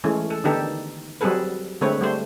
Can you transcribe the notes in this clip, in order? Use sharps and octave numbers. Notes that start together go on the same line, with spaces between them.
E3 G#3 A3 C#4
A4
D3 D#3 B3 D#4 G4 A4
F#3 G3 C4 G#4 A4 B4
D3 G#3 A3 C4 B4 C#5
G3 A3 C5